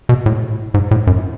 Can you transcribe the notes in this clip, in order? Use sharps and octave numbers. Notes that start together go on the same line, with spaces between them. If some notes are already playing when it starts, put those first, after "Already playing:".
B2
A2
G#2
A2
F#2